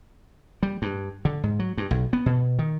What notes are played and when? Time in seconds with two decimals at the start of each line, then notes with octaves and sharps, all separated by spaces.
0.63 G3
0.82 G2
1.25 D3
1.43 G#2
1.59 F#3
1.78 G2
1.91 B1
2.13 B3
2.26 B2
2.59 D#3